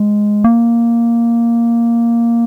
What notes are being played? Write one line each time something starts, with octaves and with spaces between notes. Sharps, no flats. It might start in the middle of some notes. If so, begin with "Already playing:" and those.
Already playing: G#3
A#3